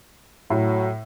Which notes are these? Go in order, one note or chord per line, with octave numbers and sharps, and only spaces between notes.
A2 F#3